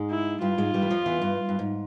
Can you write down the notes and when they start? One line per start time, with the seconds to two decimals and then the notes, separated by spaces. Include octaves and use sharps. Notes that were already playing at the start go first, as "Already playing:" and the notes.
Already playing: G#2 G#3
0.11 E4
0.41 G2 G3 F4
0.58 G#2 G#3
0.74 G2 G3
0.82 E3
0.90 F2 F3
1.06 E2 E3
1.22 G2
1.49 G2
1.59 G#2